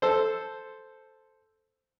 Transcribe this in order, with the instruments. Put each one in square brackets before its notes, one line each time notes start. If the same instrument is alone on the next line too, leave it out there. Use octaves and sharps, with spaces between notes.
[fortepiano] A4 C5